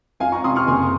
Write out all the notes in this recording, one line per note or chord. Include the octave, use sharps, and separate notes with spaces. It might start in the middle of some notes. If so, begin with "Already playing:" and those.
F2 F5 G#5
A#5 C#6
C3 C6 D#6
C#6 F6
F#1 G#5 C6